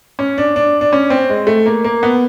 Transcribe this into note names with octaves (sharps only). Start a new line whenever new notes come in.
C#4
D4
D4
D4
C#4
C4
G#3
A3
A#3
A#3
B3